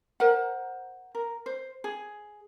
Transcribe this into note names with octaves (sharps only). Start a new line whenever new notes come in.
A#4 C5 F#5
A#4
C5
G#4